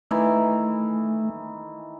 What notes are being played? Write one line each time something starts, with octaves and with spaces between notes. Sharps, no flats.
D#3 E3 A3